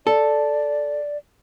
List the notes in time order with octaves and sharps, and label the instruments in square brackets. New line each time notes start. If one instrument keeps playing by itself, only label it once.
[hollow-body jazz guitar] A4 [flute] D5